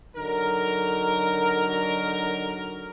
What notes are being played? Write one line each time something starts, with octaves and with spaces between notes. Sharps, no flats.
D3 F#3 D#4 A#4